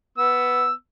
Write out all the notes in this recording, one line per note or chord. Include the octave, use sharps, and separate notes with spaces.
B3 E6